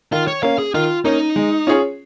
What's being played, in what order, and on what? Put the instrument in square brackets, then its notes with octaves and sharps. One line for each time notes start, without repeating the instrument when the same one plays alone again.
[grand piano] D#3 [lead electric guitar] F4
[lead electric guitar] C#5
[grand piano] A#3 C#4 [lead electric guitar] F5
[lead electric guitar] G#4
[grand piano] D#3 [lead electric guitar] F4
[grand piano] A#3 C#4 [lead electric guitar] D#4
[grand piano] G#3
C#4 F4 G#4 C#5